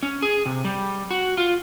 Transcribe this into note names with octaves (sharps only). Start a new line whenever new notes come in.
C#4
G#4
C3
G3
F#4
F4